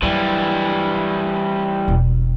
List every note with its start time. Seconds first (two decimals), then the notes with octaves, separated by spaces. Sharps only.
0.02 G2 E3 F#3 G3
1.88 E1